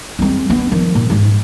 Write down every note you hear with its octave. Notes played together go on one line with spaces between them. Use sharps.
G#3 C4
B3 D4
D#3 F3
A#2
G#2 G#3